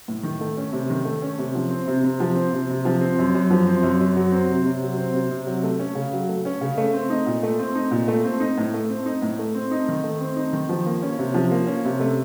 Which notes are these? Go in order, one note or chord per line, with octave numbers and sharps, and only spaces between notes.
A2
D#3
A3
C#4
C3
D#3
A3
C#4
C3
F3
C4
C3
C3
F3
C4
C3
C3
F3
C4
F#2
F#2
F3
C4
F#2
F#2
F#3
C4
C3
C3
F#3
C4
C3
C3
F#3
A3
C#4
C#3
F#3
A3
C#4
C#3
A3
C4
D#4
A#2
A3
C4
D#4
A#2
A3
C4
D#4
A2
A3
C4
D#4
A2
A3
C4
D#4
D#3
A3
C4
D#4
D#3
F3
A#3
C#4
C3
F3
A#3
C#4
C3
A3